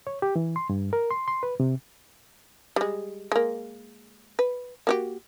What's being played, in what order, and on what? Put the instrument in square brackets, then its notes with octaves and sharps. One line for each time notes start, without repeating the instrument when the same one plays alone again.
[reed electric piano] C#5
G4
E3
C6
G2
A#4
C6
C6
B4
C3
[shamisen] G3 G#3
G#3 A#3
B4
A#3 F#4 G4